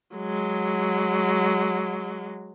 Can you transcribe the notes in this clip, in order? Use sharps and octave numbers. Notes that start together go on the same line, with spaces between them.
F#3 G#3